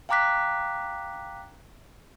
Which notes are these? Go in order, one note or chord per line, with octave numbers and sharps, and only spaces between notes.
F5 G5 A#5 D6 F#6 B6